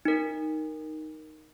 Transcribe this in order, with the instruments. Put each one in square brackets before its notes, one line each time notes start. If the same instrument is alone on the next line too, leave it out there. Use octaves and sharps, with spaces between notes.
[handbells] D#4 A#4